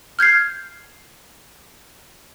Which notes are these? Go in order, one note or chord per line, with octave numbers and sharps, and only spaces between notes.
F6 G6 G#6 C7